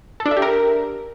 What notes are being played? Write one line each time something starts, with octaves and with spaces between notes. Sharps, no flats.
A4
D4
E5
G4
A#4